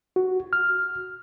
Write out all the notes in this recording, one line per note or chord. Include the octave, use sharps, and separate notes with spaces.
F#4
F6